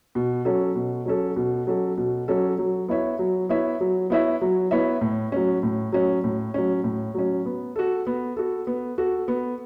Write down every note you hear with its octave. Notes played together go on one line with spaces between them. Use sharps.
B2
F#3 C#4 A4
B2
F#3 C#4 A4
B2
F#3 C#4 A4
B2
F#3 C#4 A4
F#3
B3 E4 C#5 E5
F#3
B3 E4 C#5 E5
F#3
B3 E4 C#5 E5
F#3
B3 E4 C#5 E5
A2
F#3 C#4
A2
F#3 C#4
A2
F#3 C#4
A2
F#3 C#4
B3
F#4 A4
B3
F#4 A4
B3
F#4 A4
B3